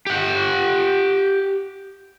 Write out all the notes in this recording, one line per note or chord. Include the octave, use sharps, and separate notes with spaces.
G4 F#5